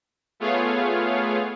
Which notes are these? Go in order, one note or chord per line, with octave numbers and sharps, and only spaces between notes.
A3 B3 F4 G#4 C#5 F5